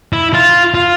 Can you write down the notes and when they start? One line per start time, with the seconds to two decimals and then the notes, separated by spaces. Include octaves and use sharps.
0.13 E4
0.33 F4
0.74 F4